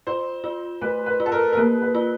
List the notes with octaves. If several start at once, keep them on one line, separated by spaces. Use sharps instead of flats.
F4 C5
F4
A3 B4
B4
F4
A4
A#4
A#4
A#3 B4
B4
F4